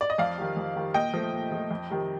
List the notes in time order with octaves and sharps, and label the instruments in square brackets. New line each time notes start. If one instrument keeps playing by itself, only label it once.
[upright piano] D5
D#5
F2 D5 F5
D#3 G3
F2
D#3 G3
A#2 D#5 G5
F3 A3
A#2
F3 A3
F2
C3 D#3 G3